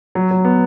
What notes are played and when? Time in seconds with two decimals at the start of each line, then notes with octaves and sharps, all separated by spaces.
0.15 F#3
0.31 F#3
0.45 B3